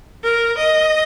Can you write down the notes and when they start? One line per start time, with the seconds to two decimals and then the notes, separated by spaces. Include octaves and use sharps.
0.23 A#4
0.58 D#5